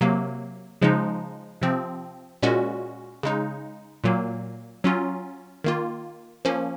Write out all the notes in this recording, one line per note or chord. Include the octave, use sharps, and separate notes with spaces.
C3 F#3 A#3
C#3 F3 G#3 D#4
C3 F3 C4
A#2 G#3 C#4 F#4
C#3 G#3 D#4
A#2 F#3 A#3
F#3 C#4 F4
D#3 A#3 F4
F3 A#3 C#4